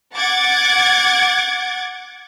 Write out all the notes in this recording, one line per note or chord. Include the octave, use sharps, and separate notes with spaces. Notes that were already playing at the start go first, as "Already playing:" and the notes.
F#5 D6 G#6 A6